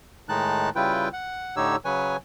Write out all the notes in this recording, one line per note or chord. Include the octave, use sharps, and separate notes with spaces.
A2 D#3 G#3 D#4 A5 F#6
C#3 G3 E4 F4 B4 G5
F#5
A2 D3 D#4 G4 C#5 E6
C#3 F#3 B4 C#5 G#5